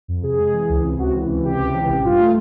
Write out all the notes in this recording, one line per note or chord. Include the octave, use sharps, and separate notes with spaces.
F2
C3 G#4
G#3
E3
C#2
C3
C#2 F#4
E3
C#2
C3 G4
C#2
E3
A1
G2 F4
A3